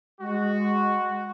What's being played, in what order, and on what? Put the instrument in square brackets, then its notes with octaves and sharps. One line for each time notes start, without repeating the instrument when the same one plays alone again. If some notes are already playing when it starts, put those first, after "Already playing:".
[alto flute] G#3 [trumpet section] F#4